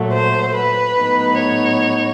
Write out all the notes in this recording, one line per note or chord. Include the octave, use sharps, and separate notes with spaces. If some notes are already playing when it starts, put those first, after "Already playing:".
Already playing: A#2 F#3 A3
C5
B4
A2 F#3 B3 D#4
C#5